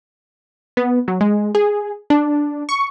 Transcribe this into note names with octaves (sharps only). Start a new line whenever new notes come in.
B3
F#3
G#3
G#4
D4
C#6